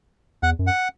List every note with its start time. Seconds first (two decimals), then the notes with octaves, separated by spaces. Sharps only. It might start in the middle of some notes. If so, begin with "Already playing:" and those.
0.43 E2 F#5
0.59 F#2
0.67 F#5